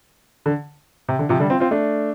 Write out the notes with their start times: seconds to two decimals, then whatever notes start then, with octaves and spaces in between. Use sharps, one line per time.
0.46 D3
1.09 C3
1.19 D3
1.29 C3 F3
1.40 D3 G3
1.50 C4 F4
1.60 C4 F4
1.71 A3 D4